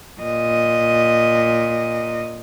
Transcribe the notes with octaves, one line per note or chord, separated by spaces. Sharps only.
A#2 D#5